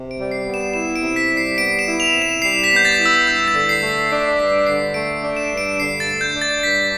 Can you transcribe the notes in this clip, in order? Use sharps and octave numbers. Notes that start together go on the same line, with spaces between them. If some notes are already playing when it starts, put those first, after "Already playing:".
Already playing: C3
D7
G3
C7
B3
E7
E4 E7
D7
C3
B6
G3
C7
B3 D7
E7
E4
F7
C3
E7
G3 C7
B6
B3
G6
A6
E4
E6
G2 G6
A6
D3
C7
A3
B6
D4 C7
G2 B6
D3 C7
A3 D7
D4
E7
G2
D7
D3 C7
A6
A3
G6
D4
A6
G2 B6